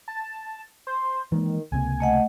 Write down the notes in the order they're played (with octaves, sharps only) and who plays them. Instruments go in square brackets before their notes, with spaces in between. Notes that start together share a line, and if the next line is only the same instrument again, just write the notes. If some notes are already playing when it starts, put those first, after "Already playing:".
[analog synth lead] A5
C5
[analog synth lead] D#3 [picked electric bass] E3 G#3 A#3
[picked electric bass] C#2 C3 A#3 [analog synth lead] G#5
[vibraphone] A3 D#5 F#5